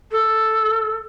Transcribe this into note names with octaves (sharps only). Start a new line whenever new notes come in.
A4